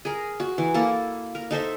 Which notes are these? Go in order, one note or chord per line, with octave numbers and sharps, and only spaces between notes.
G#4 A#4
F#4
E3
A#3 E4 A4
A#4
D#4 A4 C5 E5